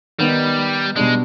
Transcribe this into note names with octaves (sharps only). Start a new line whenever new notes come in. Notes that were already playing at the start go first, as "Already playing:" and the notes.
D#3 G3 B3 D#4
B2 G3 G#3 D4